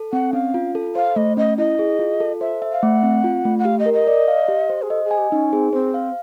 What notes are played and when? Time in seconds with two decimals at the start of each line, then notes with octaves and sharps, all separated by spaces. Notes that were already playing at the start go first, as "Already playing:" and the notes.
Already playing: A4
0.13 C4 F#5
0.33 C#4 F5
0.54 F4
0.75 A4
0.95 C5 F5
1.16 A3 D#5
1.37 C#4 D#5
1.58 E4 D#5
1.79 G#4
1.99 F4
2.20 A4
2.41 C5 E5
2.62 E5
2.72 F5
2.83 A3 F#5
3.03 C4
3.24 F4
3.45 A3
3.59 F#5
3.65 G4 F5
3.79 D#5
3.86 A#4
3.93 D#5
4.07 D5
4.28 F5
4.48 G4
4.70 C5
4.82 G#4
4.90 A4 D#5
5.04 G#4
5.11 G#5
5.18 G4
5.32 C#4 D#4
5.52 C4 G#4
5.73 C4 C5
5.94 F5